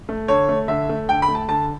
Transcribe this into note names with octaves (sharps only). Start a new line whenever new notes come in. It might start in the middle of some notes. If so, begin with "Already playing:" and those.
A3
D3 C#5
A3
D3 E5
A3
D3 G5
B5
A3
A5
D3 A5